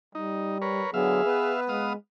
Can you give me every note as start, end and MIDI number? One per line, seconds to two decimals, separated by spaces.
0.15 0.85 55
0.15 0.58 63
0.62 0.91 70
0.62 0.91 71
0.62 0.91 73
0.94 1.21 50
0.94 1.21 54
0.94 1.21 59
0.94 1.53 68
0.94 1.61 76
0.94 1.61 77
1.25 1.93 59
1.25 1.93 71
1.69 1.96 56
1.69 1.93 77
1.69 1.93 87